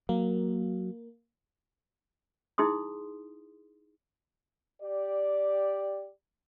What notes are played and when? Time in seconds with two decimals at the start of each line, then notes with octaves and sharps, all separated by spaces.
0.09 F#3 A#3
2.58 D#4 E4 G#4 C6 D#6
4.82 G4 D5